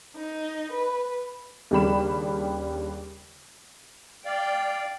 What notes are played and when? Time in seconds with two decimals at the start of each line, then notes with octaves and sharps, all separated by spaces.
0.18 D#4
0.73 B4
1.71 D#2 C#3 G3 D4 B5 E7
4.25 D5 F5 G5